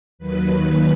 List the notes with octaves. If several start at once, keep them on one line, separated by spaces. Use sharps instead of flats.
D#2 D#3 F#3 B4
B4